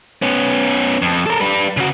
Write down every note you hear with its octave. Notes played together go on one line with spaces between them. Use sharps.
B3 C#4
F2
A4 A#4
G3 B4
C#3 F#4